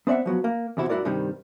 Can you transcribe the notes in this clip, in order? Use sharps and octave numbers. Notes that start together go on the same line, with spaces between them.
B3 C4 D5 E5 F#5
F3 F#3 B3
A#3
E2 C3 E4 F#4
G2 E4 F#4 A#4 D5
G2 C3 D#3 G3